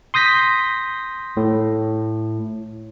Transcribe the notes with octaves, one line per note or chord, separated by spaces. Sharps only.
C6 D#6 G6 A#6 B6
A2